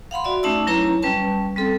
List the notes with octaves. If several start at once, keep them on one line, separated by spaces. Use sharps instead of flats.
F5 F#5 B5 C6
F#4 D5 E5
A3 C#4 D#4 A5 D6 E6
F#3 C#4 E4 B4 C#5 A#5
G3 C#4 B4 A5
G3 C4 A4